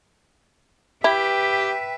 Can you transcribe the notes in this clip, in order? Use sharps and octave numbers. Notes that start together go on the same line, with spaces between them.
E4 G4 B4 E5 G5